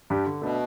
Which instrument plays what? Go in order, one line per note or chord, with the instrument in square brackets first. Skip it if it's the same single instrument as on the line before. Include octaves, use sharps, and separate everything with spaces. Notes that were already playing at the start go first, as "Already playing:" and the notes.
[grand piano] G2 G3 D4 G4
D3
[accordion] B2 [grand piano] A3 D4 B4